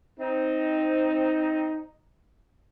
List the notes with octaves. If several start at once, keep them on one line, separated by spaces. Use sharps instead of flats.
C4 D#4